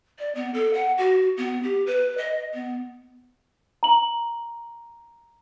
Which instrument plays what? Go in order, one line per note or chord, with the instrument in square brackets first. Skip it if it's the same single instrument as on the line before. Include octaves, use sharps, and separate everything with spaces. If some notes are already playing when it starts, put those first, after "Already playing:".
[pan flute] D5
B3
A4
F#5
F#4
B3
G4
B4
D#5
B3
[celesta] A#5 F#7